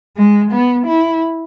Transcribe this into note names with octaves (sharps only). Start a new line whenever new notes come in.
G#3
B3
E4